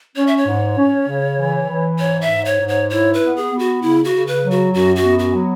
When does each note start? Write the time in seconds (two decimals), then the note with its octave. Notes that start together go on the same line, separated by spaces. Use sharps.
0.16 C#4 C#5
0.27 E5
0.37 C#5
0.47 G#2
0.77 C#4
1.07 C#3
1.38 E3
1.69 E3
1.99 G#2 C#5
2.21 E5
2.30 G#2
2.45 C#5
2.60 G#2
2.68 C#5
2.90 E4 C#5
3.14 B4
3.21 B3
3.36 G#4
3.52 B3
3.59 F#4
3.82 C#3 E4
4.05 F#4
4.13 C#3
4.27 B4
4.43 F#3
4.51 F#4
4.74 F#2 F#4
4.96 F#4
5.04 B3
5.19 F#4
5.35 F#3